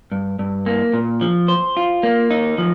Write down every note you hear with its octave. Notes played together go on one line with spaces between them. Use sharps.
G2
G2
A#3
A#2
F3
C5
F4
A#3
D#4
F3